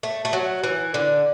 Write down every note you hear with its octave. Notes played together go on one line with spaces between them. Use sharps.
A3
A3
F#3
E3
D3